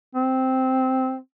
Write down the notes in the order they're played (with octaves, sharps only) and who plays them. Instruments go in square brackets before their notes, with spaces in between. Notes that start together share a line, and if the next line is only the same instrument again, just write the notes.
[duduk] C4